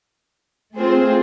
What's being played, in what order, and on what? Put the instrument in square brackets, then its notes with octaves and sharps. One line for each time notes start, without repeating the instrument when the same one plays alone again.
[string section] A3 C4 F4 G#4 C5